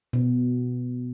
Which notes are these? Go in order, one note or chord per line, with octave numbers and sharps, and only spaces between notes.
B2